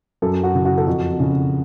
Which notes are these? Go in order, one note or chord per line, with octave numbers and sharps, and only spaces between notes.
F#2 A4
F#4
C#3
F#4
A4
F2 F#4
C#3